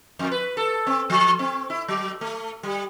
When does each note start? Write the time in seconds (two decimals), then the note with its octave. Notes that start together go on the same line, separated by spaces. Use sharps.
0.19 F2
0.31 B4
0.57 A4
0.87 C4
1.10 F3
1.39 C4
1.70 E4
1.88 F#3
2.21 A3
2.63 G3